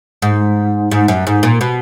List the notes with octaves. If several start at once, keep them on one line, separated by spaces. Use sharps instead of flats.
G#2
G#2
F#2
G#2
A#2
B2